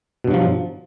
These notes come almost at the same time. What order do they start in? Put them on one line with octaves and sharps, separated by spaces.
B2 G2 F#3 F3